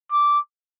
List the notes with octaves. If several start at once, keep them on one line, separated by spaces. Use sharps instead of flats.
D6